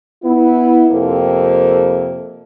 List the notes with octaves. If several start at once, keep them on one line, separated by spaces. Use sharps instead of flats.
B3 E4
F2 C3 A#3 C4 A4